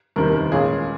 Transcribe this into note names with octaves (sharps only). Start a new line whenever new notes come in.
F1 D#2 D#3 G3 C4 A#4
A#4
A#2 G#3 C#4 F4 G#4